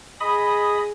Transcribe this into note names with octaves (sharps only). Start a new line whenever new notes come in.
G#4 D#5 B5 D#6